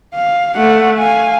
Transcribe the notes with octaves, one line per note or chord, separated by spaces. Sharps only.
F5
A3 F#5
F5 G#5